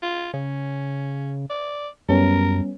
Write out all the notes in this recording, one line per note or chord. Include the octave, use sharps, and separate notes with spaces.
F4
C#3 C#4
D5
F#2 G3 B3 C#4 A#4